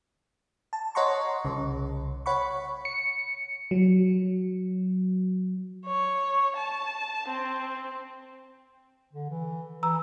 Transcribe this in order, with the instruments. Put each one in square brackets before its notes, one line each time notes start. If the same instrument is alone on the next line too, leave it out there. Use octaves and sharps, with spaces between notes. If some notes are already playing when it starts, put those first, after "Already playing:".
[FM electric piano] A5
C#5 D#5 F#5 A#5 C6 C#6
C2 C#3
C#5 F#5 B5 C#6
C#7
F#3
[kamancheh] C#5
A5
C4
[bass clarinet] D3
E3
[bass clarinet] E3 [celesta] A#5 E6